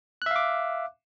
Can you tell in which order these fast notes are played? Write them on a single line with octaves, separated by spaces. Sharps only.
F#6 E5 F5 D6